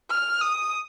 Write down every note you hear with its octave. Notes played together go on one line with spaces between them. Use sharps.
F6
D#6